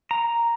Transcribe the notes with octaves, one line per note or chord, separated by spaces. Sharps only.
A#5